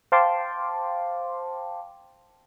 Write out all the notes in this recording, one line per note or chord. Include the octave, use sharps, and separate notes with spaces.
C5 F5 G5 A5 C6 D6